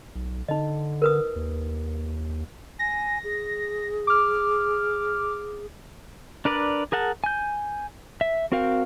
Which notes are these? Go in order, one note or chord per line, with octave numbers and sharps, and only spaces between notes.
B1
D3 D#4 D#5
A#4 B4 D#6
D#2
G#5 A#6
G#4
D6 F6
D4 A#4 B4 D5
G#4 A#4 F#5 A5
G#5 G6
E5
C4 F#4 A#4 F5 G5